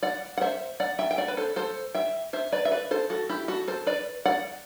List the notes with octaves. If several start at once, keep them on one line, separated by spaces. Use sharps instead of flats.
D5 F#5
F#5
C5 E5
D5 F#5
E5 G5
G5
D5 F#5
B4
A4 C5
A4 C5
E5 G5
C5 E5
B4 D5
E5
B4 D5
A4 C5
F#4 A4
E4 G4
F#4 A4
A4 C5
B4 D5
D5 F#5